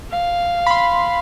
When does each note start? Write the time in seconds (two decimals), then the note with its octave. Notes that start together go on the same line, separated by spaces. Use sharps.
0.11 F5
0.67 B5 C6